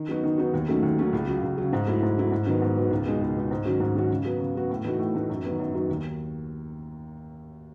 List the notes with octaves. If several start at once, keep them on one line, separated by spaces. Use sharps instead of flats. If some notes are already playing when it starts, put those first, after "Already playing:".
Already playing: D#3
F#3 B3 D#4 F#4
D#3
F#3 B3 D#4 F#4
D#2
D#3 F#3 A3 C#4
D#2
D#3 F#3 A3 C#4
C#2
C#3 F#3
C#2
C#3 F#3
G#2
F#3 A3 E4
G#2
F#3 A3 E4
G#2
D#3 F#3 B3
G#2
D#3 F#3 B3
C#2
B2 G#3 D#4
C#2
B2 G#3 D#4
G#2
D#3 F#3 C#4 F#4
G#2
D#3 F#3 C#4 F#4
C#3
F#3 B3 F#4
C#3
F#3 B3 F#4
A2
E3 A3 D#4 F#4
A2
E3 A3 D#4 F#4
F#2
D#3 F#3 B3
F#2
D#3 F#3 B3
D#2